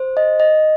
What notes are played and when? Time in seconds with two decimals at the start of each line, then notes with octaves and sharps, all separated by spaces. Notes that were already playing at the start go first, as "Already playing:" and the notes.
Already playing: C5
0.17 D#5
0.40 D#5